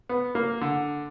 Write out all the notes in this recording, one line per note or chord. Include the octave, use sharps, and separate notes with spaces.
B3
A#3
D3